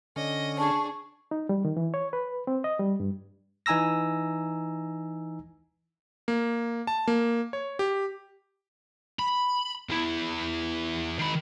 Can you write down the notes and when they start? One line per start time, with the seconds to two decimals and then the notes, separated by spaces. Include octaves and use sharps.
0.16 D3 C#4 D#5
0.58 D4 G#4 A5 C#6
1.31 D#4
1.49 G3
1.65 D#3
1.77 E3
1.94 C#5
2.13 B4
2.47 C4
2.64 D#5
2.79 G3
3.00 G2
3.66 E3 D#4 G#5 A#5 E6 A#6
6.28 A#3
6.87 A5
7.08 A#3
7.53 C#5
7.79 G4
9.19 B5
9.90 E2 E4
11.19 D#3 B5